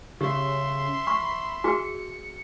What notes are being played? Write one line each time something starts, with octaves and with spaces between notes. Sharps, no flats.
C#3 G4 E5 C6
B5 C#6
F#4 G#4 C#7